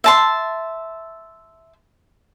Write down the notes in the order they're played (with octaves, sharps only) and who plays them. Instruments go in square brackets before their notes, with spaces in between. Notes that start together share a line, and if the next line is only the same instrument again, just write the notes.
[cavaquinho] E5 A5 C6